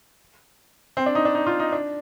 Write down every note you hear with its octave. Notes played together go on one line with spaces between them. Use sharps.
C4
D4
D#4
D4
D#4
F4
D#4
D4